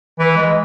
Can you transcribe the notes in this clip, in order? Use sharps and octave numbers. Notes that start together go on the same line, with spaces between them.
E3
G#3